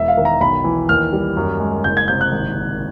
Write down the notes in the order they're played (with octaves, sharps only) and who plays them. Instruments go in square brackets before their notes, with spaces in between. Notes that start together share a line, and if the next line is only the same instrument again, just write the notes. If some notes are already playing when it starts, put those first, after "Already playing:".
Already playing: [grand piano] E1 E5
F5
D#3
A#5
B1 B5
E3
D#2 F6
G3
F#2
G#3
F#1 G6
G#6
C3 G6
F#6
G#1